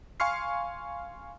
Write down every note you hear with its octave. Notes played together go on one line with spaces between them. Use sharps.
F5 G#5 C6 C#6 F6 C7